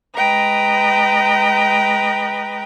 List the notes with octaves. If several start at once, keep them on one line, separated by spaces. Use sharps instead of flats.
G#3 B4 D#5 G5 A#5